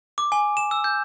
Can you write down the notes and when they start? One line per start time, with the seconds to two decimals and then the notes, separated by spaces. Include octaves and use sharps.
0.18 D6
0.32 G#5
0.57 E7
0.71 E6
0.84 G6